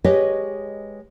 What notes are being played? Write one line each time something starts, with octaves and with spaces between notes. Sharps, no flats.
G#3 G4 B4 C#5 D#5